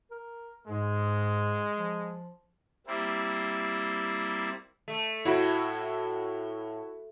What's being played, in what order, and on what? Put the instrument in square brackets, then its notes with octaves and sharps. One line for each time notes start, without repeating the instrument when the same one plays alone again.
[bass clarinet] A#4
[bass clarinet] G#2 [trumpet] G#3
[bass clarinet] F3
[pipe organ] G3 A#3 C4 E4
[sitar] A3
[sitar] A2 [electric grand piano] E4 F#4 B5